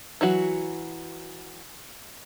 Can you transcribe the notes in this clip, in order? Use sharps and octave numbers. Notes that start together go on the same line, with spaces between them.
E3 F#3 F#4